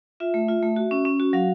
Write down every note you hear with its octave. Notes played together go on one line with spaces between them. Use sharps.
F4 E5
A3
F4
A3
F#4
C#4
C#4
F#4
F#3 F5